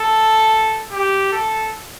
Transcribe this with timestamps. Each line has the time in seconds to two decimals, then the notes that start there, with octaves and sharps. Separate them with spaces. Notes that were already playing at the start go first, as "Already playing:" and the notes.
Already playing: A4
0.92 G4
1.32 A4